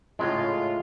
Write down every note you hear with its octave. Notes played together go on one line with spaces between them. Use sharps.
A2 C#3 G#3 F4